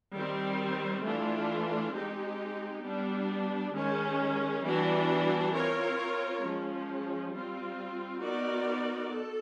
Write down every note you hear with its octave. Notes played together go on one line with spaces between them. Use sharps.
D#3 G3 C4
E3 A3 D4 F4
G#3 C4 D#4 G4
G3 B3 D4
D#3 G#3 C#4
E3 G3 B3 D4 F#4
C4 F4 A#4 C#5
F3 G#3 C#4
G3 C4 F4
B3 D#4 F#4 A#4 D5
A4